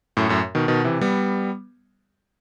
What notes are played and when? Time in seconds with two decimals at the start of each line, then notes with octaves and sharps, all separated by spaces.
0.17 F#2 A2
0.29 F#2 A2
0.55 B2 D#3
0.68 B2 D#3
0.84 C3 E3
1.01 G3 B3